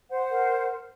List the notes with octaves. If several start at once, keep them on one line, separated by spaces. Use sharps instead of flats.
C5 F#5
A#4